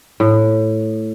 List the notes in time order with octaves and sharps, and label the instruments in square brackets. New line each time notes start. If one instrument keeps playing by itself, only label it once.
[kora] A2